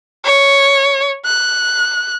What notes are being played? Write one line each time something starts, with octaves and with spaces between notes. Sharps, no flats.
C#5
F#6